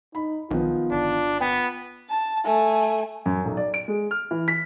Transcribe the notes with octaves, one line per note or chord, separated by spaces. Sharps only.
D#4 B5
B1 D#3 F3 B3 F4
G1 D4
B3 G5
A5
A3 G#5
F#2
B1
D5
D7
G#3
F6
E3
B6